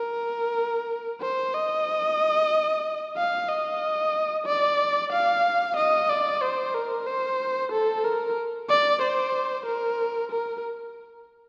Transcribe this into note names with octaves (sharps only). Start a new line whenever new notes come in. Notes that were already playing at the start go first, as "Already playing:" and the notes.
Already playing: A#4
C5
D#5
F5
D#5
D5
F5
D#5
D5
C5
A#4
C5
A4
A#4
D5
C5
A#4
A#4